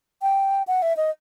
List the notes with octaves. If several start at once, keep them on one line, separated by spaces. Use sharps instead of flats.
G5
F#5
E5
D#5